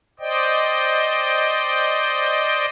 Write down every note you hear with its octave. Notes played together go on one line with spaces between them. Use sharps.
C5 D5 D#5 G5